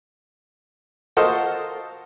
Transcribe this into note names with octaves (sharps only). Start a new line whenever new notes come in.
F4 F#4 A4 A#4 C5 D#5